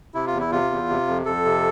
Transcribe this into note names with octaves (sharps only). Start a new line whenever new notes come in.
C3 E4
F4
E2
E4
C3 F4
E2
C3
F2
F2 A4
C3